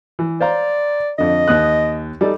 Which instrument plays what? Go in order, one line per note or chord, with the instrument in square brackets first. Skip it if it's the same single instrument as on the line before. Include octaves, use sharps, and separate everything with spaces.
[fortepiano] E3
[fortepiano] C5 F5 A#5 [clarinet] D5
[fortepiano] F2 D3 [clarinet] D#5
[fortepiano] D#2 D#6 F#6
G3 D#4 A4